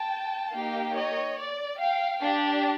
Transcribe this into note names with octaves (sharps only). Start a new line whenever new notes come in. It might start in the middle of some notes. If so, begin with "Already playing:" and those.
Already playing: G5 A5
A#3 D#4 G4 F5 G5
C#5 D#5
D5
F5 G5
D4 G4